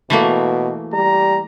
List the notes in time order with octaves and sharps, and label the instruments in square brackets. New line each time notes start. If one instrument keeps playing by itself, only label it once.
[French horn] B2 [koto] E3 A3 A#3
[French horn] G3 [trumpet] A#5